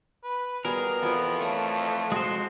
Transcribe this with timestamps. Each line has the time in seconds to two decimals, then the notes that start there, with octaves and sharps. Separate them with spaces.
0.24 B4
0.65 B2 G3 F#4 G#4 A#4
1.02 F2 E3 F3 B3
1.41 A3 C#5 D5 A#5
2.12 G#3 F#4 G#4 C5 C6